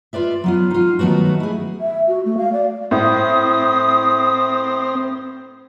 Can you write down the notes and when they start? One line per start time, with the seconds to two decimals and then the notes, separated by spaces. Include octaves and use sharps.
0.13 F4 B4 D5 E5
0.44 F#3 B3 F4
0.71 D#4 F4
0.99 D#3 F#3 A3 B3 F#4
1.40 E4 G#4
1.81 E5
2.08 F#4
2.25 A3
2.37 F5
2.53 D5
2.91 A2 C4 D#6